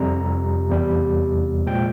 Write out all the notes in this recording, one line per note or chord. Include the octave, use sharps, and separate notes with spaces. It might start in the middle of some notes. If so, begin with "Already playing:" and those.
Already playing: F2 C3 G3 A#5
E2 C3 G3
A#2 F3 G#3 G5